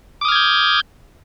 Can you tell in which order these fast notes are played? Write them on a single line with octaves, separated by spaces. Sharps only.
D6 D#6 F6 G#6 G6